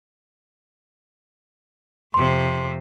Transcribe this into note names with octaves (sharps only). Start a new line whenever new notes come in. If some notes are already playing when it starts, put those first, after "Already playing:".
F2 C3 C6